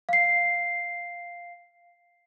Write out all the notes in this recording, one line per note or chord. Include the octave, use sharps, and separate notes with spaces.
F5 C7